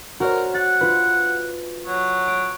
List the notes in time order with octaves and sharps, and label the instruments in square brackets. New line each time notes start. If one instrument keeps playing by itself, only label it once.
[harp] F#4 C5 C#5 [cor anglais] A#4
[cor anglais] F#5 [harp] A6
[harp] F4 B4
[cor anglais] F#3
[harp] D7